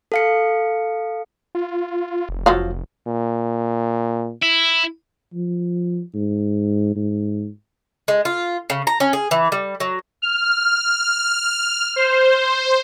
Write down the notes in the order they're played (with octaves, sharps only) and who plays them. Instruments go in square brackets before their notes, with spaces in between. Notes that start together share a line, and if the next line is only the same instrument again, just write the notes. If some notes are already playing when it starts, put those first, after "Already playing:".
[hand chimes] A4 F5 C#7
[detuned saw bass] F4
F1
[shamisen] F3 F#3 F5
[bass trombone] A#2
[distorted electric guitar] E4
[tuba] F3
G#2
G#2
[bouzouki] G#3
F4
C#3
A#5
C#4
G#4
E3
G3
F#3
[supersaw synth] F6
C5